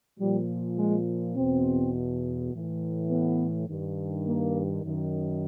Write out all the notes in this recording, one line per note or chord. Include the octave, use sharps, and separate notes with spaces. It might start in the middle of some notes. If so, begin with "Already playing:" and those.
A#2 F3 G3
G#3
E2 B2 C4
A2 E3
B3
G2 D#3
A#3
F#2 D#3